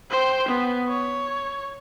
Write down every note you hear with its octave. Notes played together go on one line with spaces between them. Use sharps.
C5 G5
B3
C#5